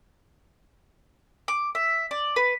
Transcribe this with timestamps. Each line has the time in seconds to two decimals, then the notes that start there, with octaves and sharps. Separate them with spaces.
1.48 D6
1.75 E5
2.11 D5
2.36 B4